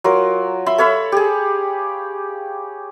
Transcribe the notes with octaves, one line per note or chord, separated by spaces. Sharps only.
F#3 F4 A#4
E5 B5 C6
A4 C#5 F5 B5
G4 G#4